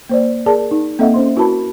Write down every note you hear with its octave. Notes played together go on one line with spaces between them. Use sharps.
A#3 C5 D5
G#4 A#4 D5 A5
D#4
A#3 C4 A4 D#5 E5 F#5
C#4 C5 C6
E4 F#4 A#4 B4 A5 B5